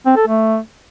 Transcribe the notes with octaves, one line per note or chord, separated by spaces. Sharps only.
C4
A4
A3